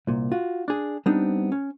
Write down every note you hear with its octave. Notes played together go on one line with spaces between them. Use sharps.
C2 A#2
F4 F#4
D4 G#4
G3 B3 C4 D4 D#4
C#4